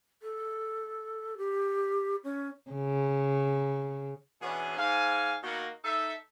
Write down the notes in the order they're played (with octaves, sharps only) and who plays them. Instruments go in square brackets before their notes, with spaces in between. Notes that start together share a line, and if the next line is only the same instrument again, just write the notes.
[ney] A4
G4
C#4
[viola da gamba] C#3
[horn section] B2 E3 B3 C#4 D4 G#4
G#2 F5 G#5
B2 A#3 D#4 F#4
D#4 A4 E5